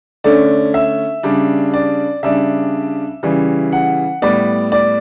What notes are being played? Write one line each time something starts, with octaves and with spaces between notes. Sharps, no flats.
D3 A3 C#4 D5
E5
C#3 G3 D4
D5
C#3 G3 D4 E5
C#3 E3 G3
F#5
A2 G3 B3 D5
D5